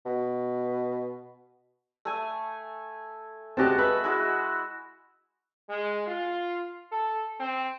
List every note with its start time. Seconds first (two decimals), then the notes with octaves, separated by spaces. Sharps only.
0.05 B2
2.05 A3 G#5
3.57 G#3 C4 F#4 G4 A5
3.78 A4 B4 E5 B5
4.04 G#3 E4 F#4
5.69 G#3
6.07 F4
6.92 A4
7.40 C4